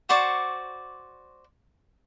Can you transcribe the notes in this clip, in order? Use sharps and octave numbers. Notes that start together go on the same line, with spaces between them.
F#4 C5 D5 C#6